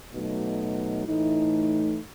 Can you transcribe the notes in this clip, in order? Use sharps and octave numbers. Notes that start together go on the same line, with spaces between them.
B2 F#3 A3 D#4 F#4
A2 E3 A3 D#4